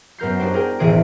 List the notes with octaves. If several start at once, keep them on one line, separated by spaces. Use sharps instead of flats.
F#2 B3 A#4 G6 C7
D4 D#4 F#4 G4 C5
G#4 A#4 G5
E1 A1 E3 G#4 C5 D7